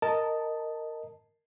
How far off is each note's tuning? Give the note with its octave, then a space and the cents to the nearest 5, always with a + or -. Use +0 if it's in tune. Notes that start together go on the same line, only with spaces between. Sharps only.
A#4 -15 D#5 +0 A5 +0